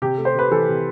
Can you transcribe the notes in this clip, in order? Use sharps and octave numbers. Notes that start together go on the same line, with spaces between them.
C3 G4
A3
C5
C3 B4
E3 A4
C3